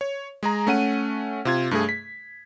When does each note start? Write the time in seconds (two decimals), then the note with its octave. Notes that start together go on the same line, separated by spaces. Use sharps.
0.01 C#5
0.43 G#3 G#4 A#5
0.67 A3 C#4 F#5 D#7
1.45 C3 F4 G#6
1.71 G2 A3 G#4
1.89 B6